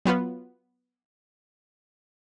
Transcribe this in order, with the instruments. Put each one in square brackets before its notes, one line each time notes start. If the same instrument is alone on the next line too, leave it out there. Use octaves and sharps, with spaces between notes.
[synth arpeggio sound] F#3 B3 F4 B4